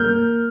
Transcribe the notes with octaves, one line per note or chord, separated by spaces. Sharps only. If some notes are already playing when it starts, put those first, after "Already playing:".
Already playing: A#3 F6 G6